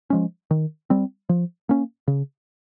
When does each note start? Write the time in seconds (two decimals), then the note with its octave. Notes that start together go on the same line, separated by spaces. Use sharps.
0.10 F3 G#3 C#4
0.51 D#3
0.90 G3 C4
1.29 F3
1.69 A#3 C#4
2.08 C#3